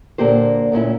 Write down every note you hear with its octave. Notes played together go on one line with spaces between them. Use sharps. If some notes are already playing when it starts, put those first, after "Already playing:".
A#2 D3 A#3 G4 C5
D2 A#2 C#4 E4